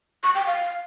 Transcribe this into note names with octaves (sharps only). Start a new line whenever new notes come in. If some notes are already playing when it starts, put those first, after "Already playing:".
C#6
G5
F5